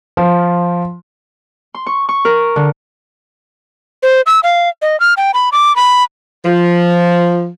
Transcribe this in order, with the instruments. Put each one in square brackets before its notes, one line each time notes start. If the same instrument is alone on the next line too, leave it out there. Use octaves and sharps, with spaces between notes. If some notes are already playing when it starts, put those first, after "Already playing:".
[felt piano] F3
[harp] C6
C#6
C#6
A#4
D3
[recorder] C5
E6
F5
D#5
F6
G5
B5
D6
B5
[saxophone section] F3